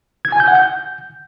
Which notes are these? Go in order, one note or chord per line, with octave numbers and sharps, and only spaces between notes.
G#6
G#5
G6
F#5
G6